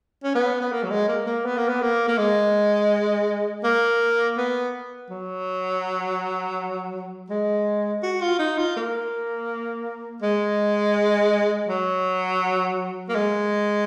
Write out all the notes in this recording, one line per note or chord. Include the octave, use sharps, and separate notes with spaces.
C#4
B3
B3
A#3
F#3
G#3
A#3
A#3
B3
A#3
B3
A#3
A#3
G#3
A#3
B3
F#3
G#3
F#4
F4
D#4
F4
A#3
G#3
F#3
A#3
G#3